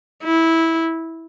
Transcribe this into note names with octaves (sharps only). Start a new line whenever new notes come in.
E4